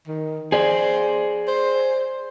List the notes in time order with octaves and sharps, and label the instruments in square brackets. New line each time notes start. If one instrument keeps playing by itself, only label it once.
[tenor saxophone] D#3
[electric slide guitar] G#4 D5 [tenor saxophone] C5
[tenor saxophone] C5